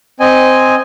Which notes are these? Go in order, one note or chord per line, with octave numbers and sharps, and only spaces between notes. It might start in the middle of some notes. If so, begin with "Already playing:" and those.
C4 D#5 G#5